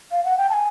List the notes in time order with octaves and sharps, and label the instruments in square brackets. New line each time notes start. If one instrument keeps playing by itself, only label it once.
[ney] F5
F#5
G5
A5
G#5